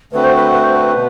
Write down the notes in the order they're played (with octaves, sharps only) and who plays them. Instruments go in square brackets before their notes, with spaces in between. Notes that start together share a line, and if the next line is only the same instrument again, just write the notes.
[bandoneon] D3 A3 C4 F#4 [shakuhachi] B4
[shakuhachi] C5
B4
B4
C5
B4
[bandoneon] B2